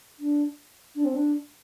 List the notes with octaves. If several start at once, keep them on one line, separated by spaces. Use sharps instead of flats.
D4
D4
C4
D4